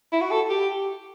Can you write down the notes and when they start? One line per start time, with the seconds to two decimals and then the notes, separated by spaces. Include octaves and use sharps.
0.12 E4
0.21 F#4
0.31 A4
0.50 G4